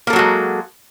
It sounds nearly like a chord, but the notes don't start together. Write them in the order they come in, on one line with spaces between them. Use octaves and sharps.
A#3 A4 F#3 F#4 G#3